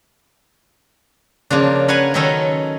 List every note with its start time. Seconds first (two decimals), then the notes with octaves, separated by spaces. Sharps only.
1.51 C#3 F3 A#3 D4
1.88 A#4 B4 C#5 F5 F#5 G#5
2.14 D#3 F#3 C#4 D#4 A4 D#5